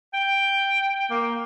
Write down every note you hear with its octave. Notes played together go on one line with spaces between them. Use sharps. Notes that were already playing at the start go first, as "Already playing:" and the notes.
G5
A#3